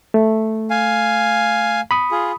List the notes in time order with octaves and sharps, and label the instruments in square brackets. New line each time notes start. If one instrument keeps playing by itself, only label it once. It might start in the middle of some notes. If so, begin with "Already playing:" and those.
[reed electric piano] A3
[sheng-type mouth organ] F5 G#5
[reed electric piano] B5 D#6
[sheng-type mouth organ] F4 G#4